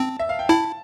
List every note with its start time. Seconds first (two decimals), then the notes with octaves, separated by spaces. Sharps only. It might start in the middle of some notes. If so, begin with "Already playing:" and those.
Already playing: C4 A5
0.19 E5
0.29 F5
0.39 G5
0.49 E4 A5